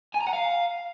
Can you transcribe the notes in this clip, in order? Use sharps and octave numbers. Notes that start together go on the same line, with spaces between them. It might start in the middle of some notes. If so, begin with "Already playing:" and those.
G#5
A#5
F#5
F5